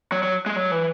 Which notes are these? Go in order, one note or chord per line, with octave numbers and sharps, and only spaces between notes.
F#3
F#3
G#3
F#3
E3